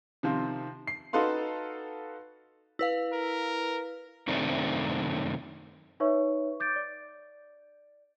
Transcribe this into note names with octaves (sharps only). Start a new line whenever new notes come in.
C3 D#3 F3 C4
C7
D#4 F#4 A4 B4 F5 C6
E4 B4 F5
A#4
F#2 C3 D#3 A3 C4 D4
D#4 B4 C#5 E5 C#6
D6 G6 A6 D7
D5